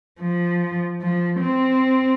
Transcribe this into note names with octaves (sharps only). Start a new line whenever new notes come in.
F3
F3
C4